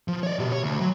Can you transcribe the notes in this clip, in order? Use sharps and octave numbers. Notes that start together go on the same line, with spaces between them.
F3
C#5 D5
B2 G4
C#5
D2
F#3